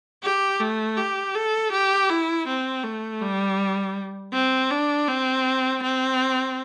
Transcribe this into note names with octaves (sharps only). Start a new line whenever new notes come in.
G4
A3
G4
A4
G4
E4
C4
A3
G3
C4
D4
C4
C4